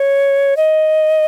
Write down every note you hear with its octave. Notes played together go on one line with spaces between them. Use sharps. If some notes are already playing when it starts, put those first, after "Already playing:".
Already playing: C#5
D#5